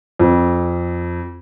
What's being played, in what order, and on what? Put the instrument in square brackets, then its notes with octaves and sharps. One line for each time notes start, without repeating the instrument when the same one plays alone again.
[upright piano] F2